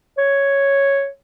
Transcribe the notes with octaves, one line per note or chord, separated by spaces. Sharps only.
C#5